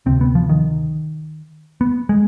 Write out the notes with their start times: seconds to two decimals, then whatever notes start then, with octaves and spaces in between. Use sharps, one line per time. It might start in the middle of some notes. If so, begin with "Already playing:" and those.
0.06 D2 C3 C4
0.21 B3
0.35 F3
0.49 D#3
1.81 B3
2.09 G#3